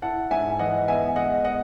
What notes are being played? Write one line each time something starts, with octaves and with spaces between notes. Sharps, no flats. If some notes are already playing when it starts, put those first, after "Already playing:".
E4 F#5 A5
G#2 E5 G#5
E3 D#5 F#5
B3 E5 G#5
G#3 D#5 F#5
D#5 F#5